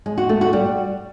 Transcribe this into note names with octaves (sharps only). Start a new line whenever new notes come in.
G#3
F#4
A3
F#4
G3